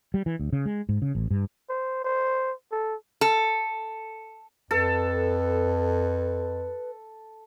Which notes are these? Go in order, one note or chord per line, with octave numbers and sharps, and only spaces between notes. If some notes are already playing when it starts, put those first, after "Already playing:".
G3
E3
D2
C#3
G#3
G#2
C#3
A1
G2
C5
C5
A4
A4
F2 A4 B4